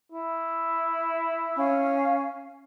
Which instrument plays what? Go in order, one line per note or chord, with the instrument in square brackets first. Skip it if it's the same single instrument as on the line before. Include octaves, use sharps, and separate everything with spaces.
[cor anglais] E4
[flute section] C#4 F5 G#5